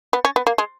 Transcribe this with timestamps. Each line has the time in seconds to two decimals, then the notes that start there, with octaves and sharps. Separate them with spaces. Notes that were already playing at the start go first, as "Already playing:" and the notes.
0.13 B3
0.25 C#4
0.36 B3
0.47 A#3
0.58 G#3